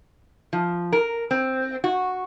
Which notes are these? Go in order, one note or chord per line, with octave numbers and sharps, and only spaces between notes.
F3
A#4
C4
F#4